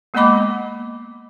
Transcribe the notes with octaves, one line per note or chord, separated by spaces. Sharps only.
G#3 A#3 B3 D#5 B5 D6